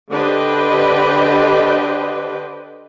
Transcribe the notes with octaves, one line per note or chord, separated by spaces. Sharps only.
D3 D4 G4 B4 C5 D#5